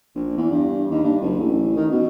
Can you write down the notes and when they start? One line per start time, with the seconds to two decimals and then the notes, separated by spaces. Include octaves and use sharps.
0.15 A#1
0.37 E2
0.51 G2
0.91 D#2
1.03 G2
1.22 F#1
1.38 A1
1.77 D#3
1.91 B2